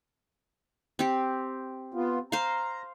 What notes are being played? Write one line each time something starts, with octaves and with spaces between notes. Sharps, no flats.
C4 G4
B3 F4
C5 F5 A#5